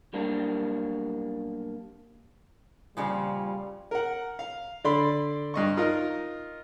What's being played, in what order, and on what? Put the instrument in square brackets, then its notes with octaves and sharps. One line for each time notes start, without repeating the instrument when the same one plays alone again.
[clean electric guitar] B1 G3 A#3 D4
[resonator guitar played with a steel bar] A#2 C#3 F3 [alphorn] G3
[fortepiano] A#4 F#5
F5
D3 D5 B5 C6
G2 D#5 C#6
D#4 F4 A#4 D#5